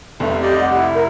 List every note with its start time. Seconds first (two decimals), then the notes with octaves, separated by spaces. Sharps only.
0.20 F1 C2 G2 A3
0.43 G4 D5 D#5
0.61 F#5
0.76 E4
0.95 A#4